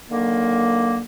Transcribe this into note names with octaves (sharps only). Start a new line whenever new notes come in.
D3 D#3 F#3 A#3